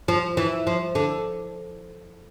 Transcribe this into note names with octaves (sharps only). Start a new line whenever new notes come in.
F3
E3
F3
D3